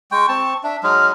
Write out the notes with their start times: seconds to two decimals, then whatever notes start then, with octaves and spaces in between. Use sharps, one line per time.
0.11 G#3 G5 C#6
0.29 C4 A5
0.63 D4 E5
0.83 F#3 G#3 D#4 F6